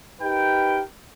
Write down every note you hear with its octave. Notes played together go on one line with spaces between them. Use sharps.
D#4 G4 A#4 B4 G5